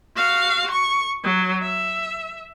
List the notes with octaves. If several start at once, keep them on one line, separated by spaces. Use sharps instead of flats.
F#4 F5
C#6
F#3
E5